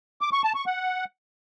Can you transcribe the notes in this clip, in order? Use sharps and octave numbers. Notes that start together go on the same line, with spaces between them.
D6
C#6
A5
C#6
F#5